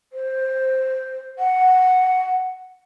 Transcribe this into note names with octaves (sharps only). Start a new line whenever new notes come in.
C5
F#5